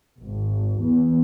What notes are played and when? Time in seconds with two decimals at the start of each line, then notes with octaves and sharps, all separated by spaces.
0.19 G#1
0.81 E2